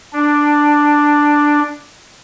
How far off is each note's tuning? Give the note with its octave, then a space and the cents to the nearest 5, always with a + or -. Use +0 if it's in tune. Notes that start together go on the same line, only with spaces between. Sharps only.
D4 +5